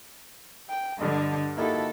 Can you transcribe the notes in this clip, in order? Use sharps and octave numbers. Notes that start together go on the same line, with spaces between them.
G5
G2 D3 D#5
A#3 D#4 E4 F#4 G4 A4